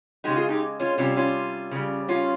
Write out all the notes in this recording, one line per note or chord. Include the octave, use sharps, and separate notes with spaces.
C#3 G#3 D#4 G4
F4 G#4
D#4 G4
C#4 F4
C3 G3 C#4 F4
C#4 F4
C#3 G3
C#4 F4